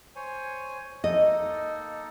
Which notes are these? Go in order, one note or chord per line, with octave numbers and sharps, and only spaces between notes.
C5 C#5 G#5
A#3 D#4 A4 D#5